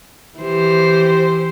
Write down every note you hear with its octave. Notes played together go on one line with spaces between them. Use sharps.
E3 G4 C5